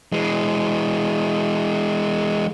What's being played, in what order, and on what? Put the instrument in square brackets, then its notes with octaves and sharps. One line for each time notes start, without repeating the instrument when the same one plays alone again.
[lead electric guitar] E3 G#3